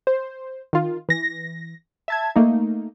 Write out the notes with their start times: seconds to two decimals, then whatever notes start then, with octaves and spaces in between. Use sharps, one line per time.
0.07 C5
0.73 D#3 F4
1.09 E3 A#6
2.08 E5 A5 G#6
2.36 A3 A#3 D#4